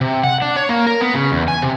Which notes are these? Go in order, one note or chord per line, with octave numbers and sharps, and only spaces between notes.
C3
F#5
D4
C#5
A#3
A#4
B3
C#3
E2
G#5
C3